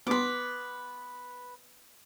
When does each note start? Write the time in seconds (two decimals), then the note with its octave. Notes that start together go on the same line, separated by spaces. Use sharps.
0.07 B3 B4 C6 D6